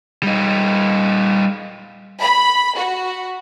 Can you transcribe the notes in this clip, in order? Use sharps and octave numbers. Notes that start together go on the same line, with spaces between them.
G3 D#4
B5
F#4